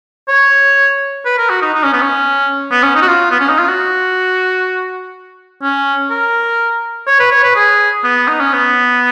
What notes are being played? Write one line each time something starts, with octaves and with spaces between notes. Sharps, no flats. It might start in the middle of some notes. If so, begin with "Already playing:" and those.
C#5
B4
A#4
F#4
D#4
D#4
C#4
B3
C#4
B3
C#4
D#4
F#4
F4
B3
C#4
D#4
F4
F#4
C#4
A#4
C#5
B4
C#5
B4
G#4
B3
D#4
C#4
B3